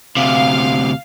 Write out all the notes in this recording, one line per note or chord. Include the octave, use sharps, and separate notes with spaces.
D2 C3 F5